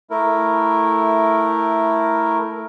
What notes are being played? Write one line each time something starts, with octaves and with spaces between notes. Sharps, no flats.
A3 E4 A#4